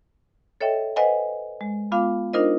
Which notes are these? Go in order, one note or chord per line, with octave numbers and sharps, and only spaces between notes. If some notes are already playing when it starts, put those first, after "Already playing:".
A4 C#5 D#5 E5 G5
B4 C5 D#5 F#5 G#5
G#3
G#3 B3 F4 F5 D6
D4 D#4 F4 A#4 C5 D#5